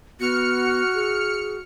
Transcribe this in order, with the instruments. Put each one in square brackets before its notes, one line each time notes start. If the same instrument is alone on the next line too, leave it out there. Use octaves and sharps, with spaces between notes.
[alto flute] B3 [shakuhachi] F#4 [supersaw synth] F6 C#7
[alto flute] G#4